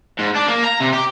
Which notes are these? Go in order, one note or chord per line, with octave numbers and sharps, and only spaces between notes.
G#2
D4
A#3
A#5
C3
G4